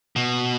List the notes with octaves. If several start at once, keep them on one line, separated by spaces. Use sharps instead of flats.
B2